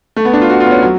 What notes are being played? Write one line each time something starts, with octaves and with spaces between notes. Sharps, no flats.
A3
B3
D4
F4
F#4
F4
B3
C#4
F#3